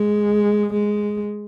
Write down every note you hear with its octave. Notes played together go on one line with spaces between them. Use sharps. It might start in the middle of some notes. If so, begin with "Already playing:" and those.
Already playing: G#3
G#3